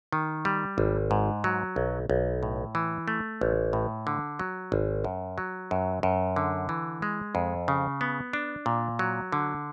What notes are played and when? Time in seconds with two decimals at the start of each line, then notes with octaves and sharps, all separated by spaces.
0.13 D#3
0.45 G3
0.78 G#1
1.11 G#2
1.44 F#3
1.76 B1
2.10 B1
2.43 A2
2.75 E3
3.08 A3
3.41 A1
3.73 A2
4.07 D3
4.39 F#3
4.72 G#1
5.04 F#2
5.38 F#3
5.71 F#2
6.03 F#2
6.36 D3
6.69 E3
7.02 G#3
7.35 F2
7.68 C#3
8.01 B3
8.33 D4
8.66 A#2
8.99 F#3
9.32 D3